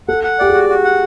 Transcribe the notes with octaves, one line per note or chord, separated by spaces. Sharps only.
A4 F#5
F#5
G4 D5
F#4 G#4
F#4
F#5